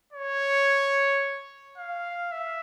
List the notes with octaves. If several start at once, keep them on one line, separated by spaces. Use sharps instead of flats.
C#5
F5
E5